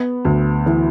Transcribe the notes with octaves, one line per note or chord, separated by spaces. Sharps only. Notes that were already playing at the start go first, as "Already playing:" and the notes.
Already playing: B3
D2
E3